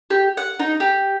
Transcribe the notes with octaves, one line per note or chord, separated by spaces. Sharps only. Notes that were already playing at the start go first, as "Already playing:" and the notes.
G4
F#5
D#4
G4